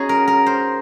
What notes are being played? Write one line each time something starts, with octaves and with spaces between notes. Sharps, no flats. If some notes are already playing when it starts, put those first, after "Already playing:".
Already playing: C#4 D#4 F#4 G#4
A#4
A#4
C5